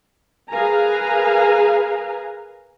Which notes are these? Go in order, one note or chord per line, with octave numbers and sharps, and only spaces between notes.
G#4 A#4 B4 F5 G#5 A#5